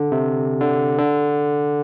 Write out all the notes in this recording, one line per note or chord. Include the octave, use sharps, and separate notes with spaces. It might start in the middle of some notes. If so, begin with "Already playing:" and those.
Already playing: D3
C3
D3
D3